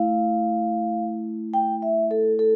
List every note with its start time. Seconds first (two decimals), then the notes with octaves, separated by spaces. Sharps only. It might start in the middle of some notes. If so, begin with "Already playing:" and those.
Already playing: A3 E4 F5
1.54 G5
1.82 E5
2.11 A4
2.39 A4